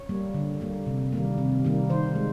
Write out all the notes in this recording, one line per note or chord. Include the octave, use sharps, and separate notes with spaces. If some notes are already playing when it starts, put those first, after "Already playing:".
Already playing: C#5
G3 A#3
D3
G3 A#3
C3
D#3 G3 A#3
C3
D#3 G3 A#3
D#3 C5
G#3